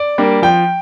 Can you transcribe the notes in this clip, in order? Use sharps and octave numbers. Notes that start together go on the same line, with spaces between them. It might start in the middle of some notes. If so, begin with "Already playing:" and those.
Already playing: D5
G3 A#3 D4
F3 G5